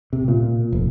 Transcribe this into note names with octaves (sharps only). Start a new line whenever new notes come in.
C3
A#2
F1